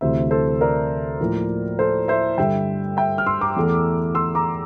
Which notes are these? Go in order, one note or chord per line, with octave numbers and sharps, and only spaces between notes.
D2 C3 E3 C5 E5
A4 C5
A#4 D5
A2 F3 A#3 F4
A4 C5
C5 E5
G2 D3 G3 E5 G5
E5 G5
F6
C6 E6
A#5 D6
E2 E3 A3
C6 E6
A#5 D6